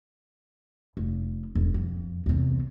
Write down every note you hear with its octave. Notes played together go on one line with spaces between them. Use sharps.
F1
E1
F2
E2 C3